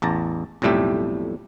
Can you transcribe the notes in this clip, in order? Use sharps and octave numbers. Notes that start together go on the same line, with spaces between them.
A1 E2 A5 A#5
B1 F2 A2 G3 A3 G4